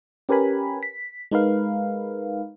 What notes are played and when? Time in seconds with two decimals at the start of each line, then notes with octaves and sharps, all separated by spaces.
0.29 C#4 G4 A#4 B4 G#5 B5
0.83 B6
1.31 G#3 D#4 A#4 B4 F5